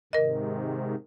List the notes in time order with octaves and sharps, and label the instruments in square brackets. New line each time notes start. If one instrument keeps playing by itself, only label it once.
[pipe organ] G#2 C3 D#3 [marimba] A#4 D#5